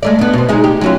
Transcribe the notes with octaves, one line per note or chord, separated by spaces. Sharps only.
G#3 A3 D5
B3 D4
B2 C4
G#3 D#4 G#4
G4
F#3 C#4 F4